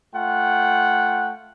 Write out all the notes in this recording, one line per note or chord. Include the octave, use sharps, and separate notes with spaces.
A3 F4 F#5 G5